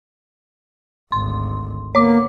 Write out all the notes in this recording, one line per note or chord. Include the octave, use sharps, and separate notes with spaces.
G#1 D2 C6
D3 A#3 B3 C#5 D6